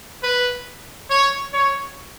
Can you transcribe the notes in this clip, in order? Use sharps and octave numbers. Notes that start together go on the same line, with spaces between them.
B4
C#5
C#5